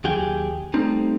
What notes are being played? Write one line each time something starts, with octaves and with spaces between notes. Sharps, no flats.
D#2 F#3 G4 G#4 G5
G3 A3 C4 D#4